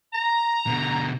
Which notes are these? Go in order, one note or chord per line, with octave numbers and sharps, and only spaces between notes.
A#5
B2 D3